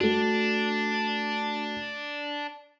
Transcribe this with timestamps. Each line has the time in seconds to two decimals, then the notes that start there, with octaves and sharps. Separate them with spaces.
0.01 A3 D4 F#4